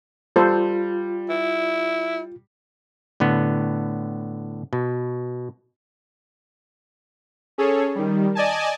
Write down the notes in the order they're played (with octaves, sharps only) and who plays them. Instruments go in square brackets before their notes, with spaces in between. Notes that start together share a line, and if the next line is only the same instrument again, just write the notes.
[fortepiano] G3 [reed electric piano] F4 [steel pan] A4 C5
[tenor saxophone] E4
[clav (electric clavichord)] A2 D3 B3
B2
[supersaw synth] C#4 G#4 A4 C#5
D#3 G3
D5 D#5 G#5 A5